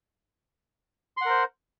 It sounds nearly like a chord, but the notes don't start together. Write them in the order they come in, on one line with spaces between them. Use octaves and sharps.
C6 F#5 A#4 C5